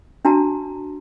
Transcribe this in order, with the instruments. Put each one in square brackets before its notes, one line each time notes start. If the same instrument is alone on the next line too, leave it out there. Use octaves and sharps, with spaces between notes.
[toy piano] D4 F#4 A5 A#5